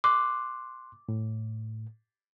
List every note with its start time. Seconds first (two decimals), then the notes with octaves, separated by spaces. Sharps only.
0.04 C6 D6 F#6
1.09 A2